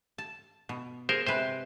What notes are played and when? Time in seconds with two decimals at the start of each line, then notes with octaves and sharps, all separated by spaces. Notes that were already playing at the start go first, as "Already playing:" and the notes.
0.18 A5
0.69 B2
1.09 G#4 A#4 C5
1.27 C3 G#3 B4 C5